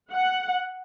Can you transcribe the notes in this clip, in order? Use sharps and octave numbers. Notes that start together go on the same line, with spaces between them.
F#5